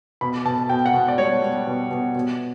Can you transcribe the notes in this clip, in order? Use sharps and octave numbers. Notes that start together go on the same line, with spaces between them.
B2 B5
B2 A5
B2 G5
F#5
B2
D5
G3 C#5
G3
B2
B2
B2